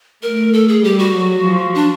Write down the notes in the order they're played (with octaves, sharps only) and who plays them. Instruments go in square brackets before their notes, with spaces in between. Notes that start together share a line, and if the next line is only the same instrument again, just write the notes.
[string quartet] A3 [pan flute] A#4
[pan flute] A4
G#4
[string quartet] G3 [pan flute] G4
[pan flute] F#4
[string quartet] F#3
F3
[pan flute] D4